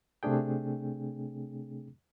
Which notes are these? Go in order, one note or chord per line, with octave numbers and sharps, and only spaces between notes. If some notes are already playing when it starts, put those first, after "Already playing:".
C3 A3 C4 D4 G#4 G5